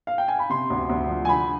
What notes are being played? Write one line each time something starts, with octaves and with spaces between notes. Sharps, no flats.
F5
G5
G#5
B5
C3 C6
D2
D2
F3
G#5
D3 B5